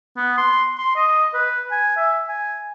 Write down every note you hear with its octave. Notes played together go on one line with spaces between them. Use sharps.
B3
C6
C6
D#5
B4
G#5
E5
G#5